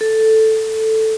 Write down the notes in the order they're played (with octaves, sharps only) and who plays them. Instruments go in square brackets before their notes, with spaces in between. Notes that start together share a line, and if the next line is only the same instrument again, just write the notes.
[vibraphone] A4